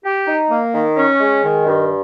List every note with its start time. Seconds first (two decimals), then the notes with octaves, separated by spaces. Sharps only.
0.04 G4
0.27 D#4
0.50 A#3
0.74 D#3
0.97 C#4
1.20 G#3
1.44 D#3
1.67 G2